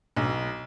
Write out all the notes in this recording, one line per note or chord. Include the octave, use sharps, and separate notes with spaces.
B1